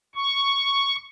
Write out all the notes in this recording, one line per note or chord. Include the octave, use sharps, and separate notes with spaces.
C#6